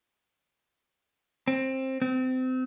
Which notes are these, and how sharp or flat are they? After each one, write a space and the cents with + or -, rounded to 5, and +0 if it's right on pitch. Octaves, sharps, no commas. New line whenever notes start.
C4 +15
C4 -30